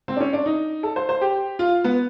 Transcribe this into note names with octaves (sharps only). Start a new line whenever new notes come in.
C4
D4
C#4
D4
D#4
A4
C5
C5
G4
F4
B3